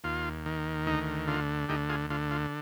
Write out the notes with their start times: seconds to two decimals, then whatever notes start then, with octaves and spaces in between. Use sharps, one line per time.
0.04 D#2 F4
0.46 D#3
0.87 D2 D#4
1.28 D3 F4
1.69 D2 D#4 G4
1.89 F4 G#4
2.10 D3 F4
2.31 F4